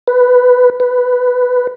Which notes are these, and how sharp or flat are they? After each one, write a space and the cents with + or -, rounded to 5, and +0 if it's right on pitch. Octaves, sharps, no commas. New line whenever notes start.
B4 +10
B4 +10